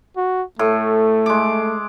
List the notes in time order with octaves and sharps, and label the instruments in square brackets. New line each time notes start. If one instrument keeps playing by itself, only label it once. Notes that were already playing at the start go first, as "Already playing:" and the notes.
[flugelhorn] F#4
[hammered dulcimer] A2 [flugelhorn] A3
[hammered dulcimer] G#3 D6